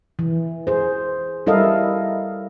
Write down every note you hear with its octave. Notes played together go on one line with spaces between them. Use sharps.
E3
G#4 C5
G3 E4 A4 A#4 D#5 F5